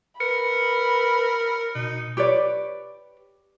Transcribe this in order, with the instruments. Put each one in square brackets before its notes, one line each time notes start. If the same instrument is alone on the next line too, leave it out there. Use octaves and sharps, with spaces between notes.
[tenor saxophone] A#4 [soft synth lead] B4 [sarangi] B5 [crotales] C#7
[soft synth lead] B2 [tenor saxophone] D#4
[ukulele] G4 B4 C#5 D5